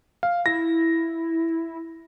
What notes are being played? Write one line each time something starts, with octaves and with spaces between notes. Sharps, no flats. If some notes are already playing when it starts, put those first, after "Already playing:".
F5
E4 A#6